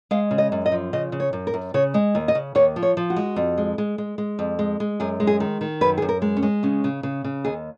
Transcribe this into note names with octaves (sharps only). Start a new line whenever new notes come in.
G#3 F5
C#3
D#5
F#2
D#5
F3
C#3 D#5
C#3
C#5
F#2
A#4
F#2
C#3 C#5
G#3
D#2
D#5
C#3
D#2 C#5
F3
C#5
F3
F#4
G#3
F2
G#3
G#3
G#3
G#3
F2
G#3
G#3
F#2 G#4
G#3
G#4
D#3
D#3
F#2 B4
F#2 G#4
A#4
G#3
C#4
G#3
C#3 C#4
C#3
C#3
C#3
D#2 G#4